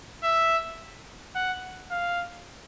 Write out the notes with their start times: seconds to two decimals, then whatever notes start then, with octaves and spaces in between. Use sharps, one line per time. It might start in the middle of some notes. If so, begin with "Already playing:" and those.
0.24 E5
1.35 F#5
1.91 F5